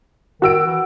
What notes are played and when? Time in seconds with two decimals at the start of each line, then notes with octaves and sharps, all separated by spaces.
0.42 D#3 F#4 E6 D7
0.66 E3